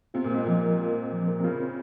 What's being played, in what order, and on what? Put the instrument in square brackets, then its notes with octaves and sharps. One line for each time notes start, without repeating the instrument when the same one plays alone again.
[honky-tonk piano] C3 [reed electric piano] F4
[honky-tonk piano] A#2
[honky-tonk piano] G#2 [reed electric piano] C4
[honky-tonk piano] A#2 [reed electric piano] F3
[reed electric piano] A#4
F4
C4
F3
A#4
[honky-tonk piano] C3
[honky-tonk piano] C#3 [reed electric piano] F4
[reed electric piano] C4